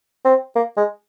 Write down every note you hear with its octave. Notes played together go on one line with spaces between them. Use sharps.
C4
A#3
G#3